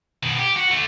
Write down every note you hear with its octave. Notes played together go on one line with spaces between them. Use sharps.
B2 D#3
G4
F#4
D3 A3